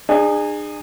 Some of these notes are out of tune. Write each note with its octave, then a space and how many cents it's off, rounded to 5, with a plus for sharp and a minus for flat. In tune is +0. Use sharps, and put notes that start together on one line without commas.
D4 +45 G#4 -15